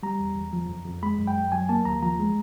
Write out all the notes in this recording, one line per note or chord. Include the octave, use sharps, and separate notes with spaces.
G3 A#5
E2
E2
F3
F2
F2
G#3 B5
F#2
G5
F#2
F#3 G#5
A#3 A5
D#2 A#5
F3 A#5
G#3